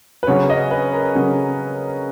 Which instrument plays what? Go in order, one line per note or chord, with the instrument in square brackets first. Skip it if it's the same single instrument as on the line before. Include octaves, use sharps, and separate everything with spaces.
[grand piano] B4
[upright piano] C#3 F#3 C#4 [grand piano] C#5
[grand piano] D#5
B4
A#4
[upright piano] C#3 F#3 C#4